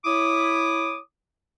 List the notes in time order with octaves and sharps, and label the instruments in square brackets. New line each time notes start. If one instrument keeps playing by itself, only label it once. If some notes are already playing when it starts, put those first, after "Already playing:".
[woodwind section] E4 C#5 D6 D#6